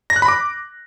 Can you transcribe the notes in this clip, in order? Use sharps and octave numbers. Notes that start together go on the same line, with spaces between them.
A#6
F#6
B5
D6